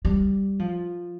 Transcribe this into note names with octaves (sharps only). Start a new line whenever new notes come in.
G3
F3